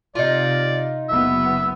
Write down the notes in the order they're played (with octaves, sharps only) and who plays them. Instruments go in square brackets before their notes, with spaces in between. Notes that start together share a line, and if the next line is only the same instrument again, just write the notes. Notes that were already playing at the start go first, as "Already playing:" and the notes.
[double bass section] C3 [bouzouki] D#4 F4 [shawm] D5
[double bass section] F#1 B3 [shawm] E5